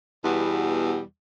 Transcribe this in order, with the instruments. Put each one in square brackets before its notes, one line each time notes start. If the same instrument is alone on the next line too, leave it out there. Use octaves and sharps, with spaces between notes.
[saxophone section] E2 B2 G3